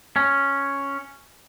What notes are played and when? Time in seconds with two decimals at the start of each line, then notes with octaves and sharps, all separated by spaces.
0.16 C#4